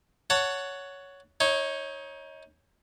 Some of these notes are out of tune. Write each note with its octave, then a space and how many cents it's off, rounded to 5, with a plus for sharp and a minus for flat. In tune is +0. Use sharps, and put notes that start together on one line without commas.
C#5 +10 F#5 +0 A5 +20
D#4 +25 C#5 -10